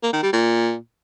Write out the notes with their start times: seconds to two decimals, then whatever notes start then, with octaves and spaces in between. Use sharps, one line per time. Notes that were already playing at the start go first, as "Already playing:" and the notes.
0.03 A#3
0.13 D#3
0.23 G3
0.33 A#2